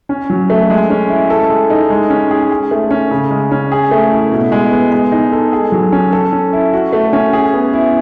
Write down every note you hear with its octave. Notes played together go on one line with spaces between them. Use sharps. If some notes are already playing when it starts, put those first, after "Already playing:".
C#4
F#3
A3
G#3
C#4
E4
A4
G#3
D#4
G#3
C#4
G#4
G#4
A3
C#4
C#3
G#3
C#4
G#4
A3
E4
B2
G#3
B3
G#3
D#4
A4
G#4
F#3
C#4
A4
C#4
E4
F#4
A3
C#4
G#4
B3
E4